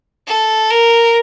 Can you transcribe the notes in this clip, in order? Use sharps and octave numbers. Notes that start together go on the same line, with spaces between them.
A4
A#4